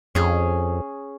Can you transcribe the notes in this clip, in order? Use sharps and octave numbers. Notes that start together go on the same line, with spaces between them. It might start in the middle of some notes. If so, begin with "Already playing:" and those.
F2 C#4 G#4